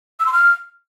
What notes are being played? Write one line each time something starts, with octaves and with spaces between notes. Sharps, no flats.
E6
C6
F6